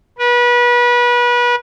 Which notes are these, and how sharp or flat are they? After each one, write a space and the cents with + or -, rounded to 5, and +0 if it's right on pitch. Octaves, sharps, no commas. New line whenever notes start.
B4 -30